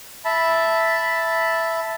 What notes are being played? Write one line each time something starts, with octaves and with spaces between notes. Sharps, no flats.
E5 A5 B5